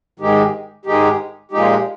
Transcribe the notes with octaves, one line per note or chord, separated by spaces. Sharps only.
G#2 D#3 G#3 D#4 G4
G#2 D#3 G#3 D#4 G4
A#2 F3 G#3 D#4 G4